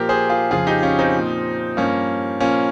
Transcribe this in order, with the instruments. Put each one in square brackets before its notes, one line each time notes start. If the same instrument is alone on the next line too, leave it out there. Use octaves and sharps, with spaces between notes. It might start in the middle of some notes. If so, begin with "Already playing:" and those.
Already playing: [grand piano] A#2 F3 G4 A#4
G#4 C5
F4 G#4
F2 C#3 F3 F4 G#4
D#4 G4
C#4 F4
C4 D#4
A#2 F3
G2 F3 A#3 C#4
A#2 F3 A#3 C#4